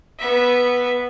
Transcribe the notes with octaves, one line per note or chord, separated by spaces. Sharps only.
B3 E5